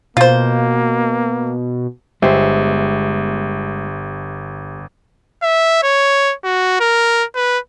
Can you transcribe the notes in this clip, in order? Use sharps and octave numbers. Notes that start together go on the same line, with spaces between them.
B2 A#3 F4 C5
G1 G#3 B3 G4 C5 E5
E5
C#5
F#4
A#4
B4